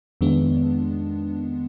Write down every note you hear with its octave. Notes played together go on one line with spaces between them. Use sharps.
F2 D#3 G#3 B3 D4